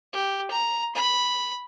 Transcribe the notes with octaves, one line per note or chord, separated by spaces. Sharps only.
G4
A#5
B5